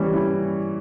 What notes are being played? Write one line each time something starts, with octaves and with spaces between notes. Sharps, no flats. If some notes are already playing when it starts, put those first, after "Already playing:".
Already playing: E3 G3 C#4 E4
E4